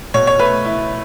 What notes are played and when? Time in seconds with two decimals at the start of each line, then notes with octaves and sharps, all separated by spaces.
0.14 B2 C#5
0.27 C#5
0.39 A3 B4
0.65 E4